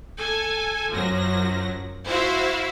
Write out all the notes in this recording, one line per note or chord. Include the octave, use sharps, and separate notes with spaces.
A4 G#5
F#2 F3 F#3 A#6
E4 F#4 C5 E5 F5